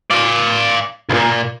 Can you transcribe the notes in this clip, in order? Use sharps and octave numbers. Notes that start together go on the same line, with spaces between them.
D5 F5
C#2 A#2